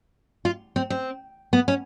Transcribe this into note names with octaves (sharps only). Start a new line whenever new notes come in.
F4
C4
C4
B3
C#4